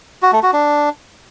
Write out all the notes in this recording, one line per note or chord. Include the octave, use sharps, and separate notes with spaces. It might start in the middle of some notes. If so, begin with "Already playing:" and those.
F#4
A3
F#4
D4